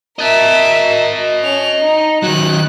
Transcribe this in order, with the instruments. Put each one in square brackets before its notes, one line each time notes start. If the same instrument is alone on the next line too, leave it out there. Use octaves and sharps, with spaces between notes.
[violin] A#4 E5 [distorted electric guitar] D#5 A5
[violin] C#4 F7
D#4
[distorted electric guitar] D#3 F#3 [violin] F#6